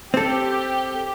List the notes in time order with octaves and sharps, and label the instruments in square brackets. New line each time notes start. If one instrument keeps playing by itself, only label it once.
[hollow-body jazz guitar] C4 A4 [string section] G4